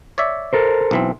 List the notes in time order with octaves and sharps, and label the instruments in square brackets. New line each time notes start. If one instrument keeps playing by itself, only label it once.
[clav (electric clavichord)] C#5 D5 E5
[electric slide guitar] A4 A#4 C5
[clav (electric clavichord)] B1 E3 C4